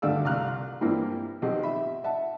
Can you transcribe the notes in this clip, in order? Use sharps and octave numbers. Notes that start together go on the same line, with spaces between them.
D2 G2 A3 D5 F5 E6
C2 F5 A#5 F6 F#6
G2 E3 A#3 C4 E4
B1 C4 G4
E5 B5
E5 F#5 A5